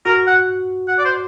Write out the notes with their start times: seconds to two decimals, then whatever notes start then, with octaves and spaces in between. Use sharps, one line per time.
0.05 F#4 A#4
0.27 F#5
0.88 F#5
0.99 D5
1.05 C5